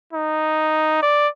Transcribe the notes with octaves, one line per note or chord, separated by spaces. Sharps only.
D#4
D5